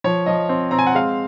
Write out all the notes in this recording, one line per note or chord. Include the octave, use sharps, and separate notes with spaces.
F3 C#5
F3 D#5
C4
C4 A#5
G#5
F#5
G#3 F5